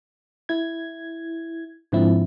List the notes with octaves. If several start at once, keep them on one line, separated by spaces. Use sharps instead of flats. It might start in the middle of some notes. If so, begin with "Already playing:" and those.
E4 G#6
G#2 D3 F3 C4 E4